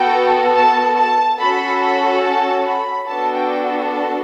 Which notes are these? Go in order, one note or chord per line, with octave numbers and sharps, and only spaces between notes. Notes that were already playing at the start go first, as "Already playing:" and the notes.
Already playing: B3 F#4 A4 G5
A5
A5
C#4 F#4 A4 B5
B5
A5
B5
B3 D4 F#4 A4 A5
G5
A5